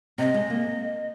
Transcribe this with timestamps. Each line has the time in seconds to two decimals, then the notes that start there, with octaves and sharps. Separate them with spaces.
0.18 C3 D#5
0.34 G#3
0.50 A#3